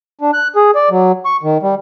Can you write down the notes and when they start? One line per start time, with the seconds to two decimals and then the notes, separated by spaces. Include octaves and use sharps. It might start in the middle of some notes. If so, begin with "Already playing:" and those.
0.21 D4
0.34 F#6
0.56 G#4
0.75 D5
0.90 F#3
1.25 C#6
1.43 D#3
1.62 G3